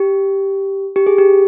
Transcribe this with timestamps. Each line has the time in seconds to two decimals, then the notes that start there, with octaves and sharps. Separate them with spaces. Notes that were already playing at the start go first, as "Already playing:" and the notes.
Already playing: G4
0.96 G4
1.07 G#4
1.18 G4